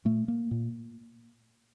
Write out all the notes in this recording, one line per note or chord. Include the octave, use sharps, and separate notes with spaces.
A#2 A3
A#3
A#2